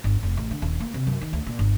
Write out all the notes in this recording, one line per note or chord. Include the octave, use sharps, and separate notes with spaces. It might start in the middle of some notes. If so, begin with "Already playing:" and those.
G1
F1
A1
D3
D#1
A#3
C3
F#2
D#3
D2
A#2
G1